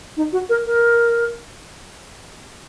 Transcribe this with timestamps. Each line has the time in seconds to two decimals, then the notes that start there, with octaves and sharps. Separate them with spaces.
0.17 D#4
0.32 F#4
0.49 A#4
0.66 A#4